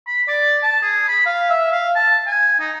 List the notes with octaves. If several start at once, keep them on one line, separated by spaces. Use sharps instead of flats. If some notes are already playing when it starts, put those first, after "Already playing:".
B5
D5
A5
G#4
B5
F5
E5
F5
A5
G#5
D#4